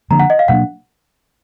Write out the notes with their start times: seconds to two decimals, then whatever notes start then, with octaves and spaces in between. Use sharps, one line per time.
0.11 D3 F3 A#3 D4 A#5
0.20 F#5
0.30 D#5
0.39 F5
0.48 B2 F#3 A#3 D4 F#5